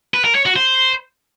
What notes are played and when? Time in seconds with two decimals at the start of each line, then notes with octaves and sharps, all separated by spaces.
0.14 B4
0.24 A#4
0.35 C#5
0.45 F#4
0.56 C5